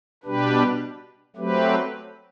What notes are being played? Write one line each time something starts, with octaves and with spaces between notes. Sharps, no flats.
B2 G3 D4 G4 B4
F#3 A3 C4 G4 B4